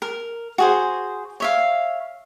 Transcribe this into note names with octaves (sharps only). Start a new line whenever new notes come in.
A#4
F#4 G#4 C5
C#5 E5 F5